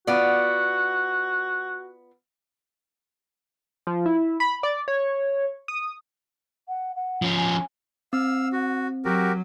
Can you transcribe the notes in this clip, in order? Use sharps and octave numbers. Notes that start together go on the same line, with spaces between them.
B3 F4 F#4 D5
F3
E4
B5
D5
C#5
D#6
F#5
F#5
F3 C#4
G#5
C4 F5 E6
F#4
F#3 F#4 G4 A#4